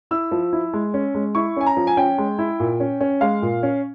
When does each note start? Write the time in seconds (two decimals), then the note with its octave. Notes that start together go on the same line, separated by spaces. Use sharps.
0.11 E4 E6
0.31 F3
0.53 E4
0.73 G#3
0.94 C#4
1.14 G#3
1.35 E4 C#6
1.57 C#4 G#5
1.66 A#5
1.77 F3
1.87 G#5
1.97 C#4 G5
2.18 G#3
2.39 E4
2.60 A#2
2.80 C#4
3.01 C#4
3.21 G#3 F5
3.42 A#2
3.63 C#4